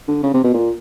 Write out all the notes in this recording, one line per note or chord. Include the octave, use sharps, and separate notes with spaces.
D3
C#3
C3
B2
A#2